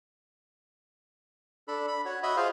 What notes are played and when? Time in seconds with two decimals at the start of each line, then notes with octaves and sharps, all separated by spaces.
1.68 D4 A4 B5
1.88 B5
2.05 F#4 C#5
2.23 F#4 D#5 E5 B5
2.37 F4 G#4 C5 F5